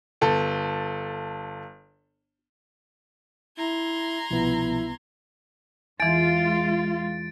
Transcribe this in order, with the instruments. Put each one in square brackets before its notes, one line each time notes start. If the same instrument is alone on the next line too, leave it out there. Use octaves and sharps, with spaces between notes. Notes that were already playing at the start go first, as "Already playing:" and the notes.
[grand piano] G1 A4
[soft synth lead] E4 [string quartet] A#5 C6 G#6
[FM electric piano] C2 B3 [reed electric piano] B2 F3 [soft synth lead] E4
[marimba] E2 E3 [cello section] G#3 F4 [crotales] A6 D7